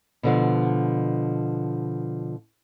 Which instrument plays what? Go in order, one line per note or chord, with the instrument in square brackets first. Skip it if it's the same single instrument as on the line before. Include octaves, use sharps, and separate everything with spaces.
[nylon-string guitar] B2 D3 F3